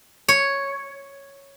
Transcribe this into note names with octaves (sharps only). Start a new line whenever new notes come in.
C#5